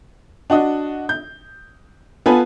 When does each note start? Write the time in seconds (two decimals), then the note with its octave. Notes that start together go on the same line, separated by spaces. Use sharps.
0.50 D4 F#4 D#5
1.09 G6
2.26 B3 F4 A4 B4 G#5 B5